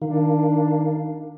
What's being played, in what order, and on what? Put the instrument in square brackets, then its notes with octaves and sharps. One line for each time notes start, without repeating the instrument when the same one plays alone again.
[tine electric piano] D#3 [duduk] D4 [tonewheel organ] D#4 A#4 F5